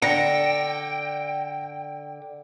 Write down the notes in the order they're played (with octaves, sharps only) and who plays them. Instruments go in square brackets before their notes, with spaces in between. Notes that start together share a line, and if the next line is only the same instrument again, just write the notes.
[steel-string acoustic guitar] D3 [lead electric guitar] G5 [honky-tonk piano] A#6 C#7